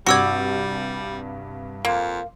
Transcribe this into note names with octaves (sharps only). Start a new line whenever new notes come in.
C2 G2 G3 F#4 D5 C#6 E6 G#6
F2 A#3 C6